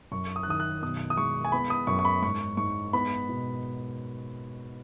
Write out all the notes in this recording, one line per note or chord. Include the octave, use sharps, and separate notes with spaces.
F#2 C#6
D#6
F#6
D#3 D#6
F#6
B2 D#6
D#6
G#3 C#6
G#5
B3 B5
D#6
F#2 C#6
C#6
B5
G#2 C#6
G#2 C#6
B3 B5
B2